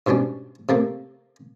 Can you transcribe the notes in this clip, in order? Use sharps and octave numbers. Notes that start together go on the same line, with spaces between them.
G#2 B2 G3 C#4 D4
C3 A3 A#3